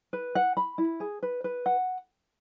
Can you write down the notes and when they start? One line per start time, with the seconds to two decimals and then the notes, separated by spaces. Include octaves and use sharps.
0.13 B4
0.35 F#5
0.57 B5
0.78 E4
1.00 G#4
1.23 B4
1.44 B4
1.66 F#5